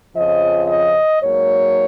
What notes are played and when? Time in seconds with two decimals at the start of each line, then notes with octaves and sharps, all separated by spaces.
0.15 F2 C#3 F3 D#5
0.68 D#5
1.20 G#2 F#3 A#3 C#5